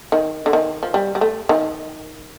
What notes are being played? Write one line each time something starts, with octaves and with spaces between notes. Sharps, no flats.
D#3
D3
D#3
F3
G3
G3
A3
D#3